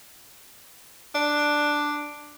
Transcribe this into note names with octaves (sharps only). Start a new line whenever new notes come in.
D4